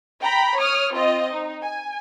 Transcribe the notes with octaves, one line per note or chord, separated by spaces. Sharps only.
G5 A#5 B5
C#5 D#6 F6
C4 F4 D#5
D#4
G#5